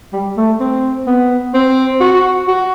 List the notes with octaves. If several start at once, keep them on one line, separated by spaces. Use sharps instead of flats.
G3
A3
C4
B3
C4
F#4
F#4